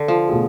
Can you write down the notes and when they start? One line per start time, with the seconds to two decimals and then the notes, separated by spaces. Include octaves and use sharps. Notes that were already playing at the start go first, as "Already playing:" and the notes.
Already playing: D3
0.08 F3
0.29 B2 A3 F4 G#4